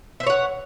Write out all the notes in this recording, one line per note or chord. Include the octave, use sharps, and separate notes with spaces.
C5 C#5 E5 F#5